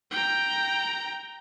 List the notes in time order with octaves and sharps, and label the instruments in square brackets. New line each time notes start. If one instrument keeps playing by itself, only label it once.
[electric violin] G5 A#5